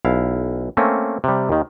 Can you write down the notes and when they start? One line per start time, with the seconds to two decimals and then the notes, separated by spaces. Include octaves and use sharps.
0.05 B1 E4 F5
0.77 A3 A#3 C4 C#4
1.24 C3 G3
1.49 D#2 D#3